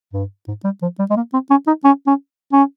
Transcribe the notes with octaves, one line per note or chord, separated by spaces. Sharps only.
G2
G#2
G3
F3
G3
G#3
A#3
C4
C#4
D#4
C#4
C#4
C#4